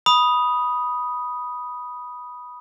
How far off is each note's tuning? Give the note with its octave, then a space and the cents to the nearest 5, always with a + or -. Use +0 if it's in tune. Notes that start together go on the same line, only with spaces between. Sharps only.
B5 -10 D#6 +0